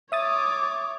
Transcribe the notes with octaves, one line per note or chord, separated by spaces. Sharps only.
C#5 E5 D6 D#6 A6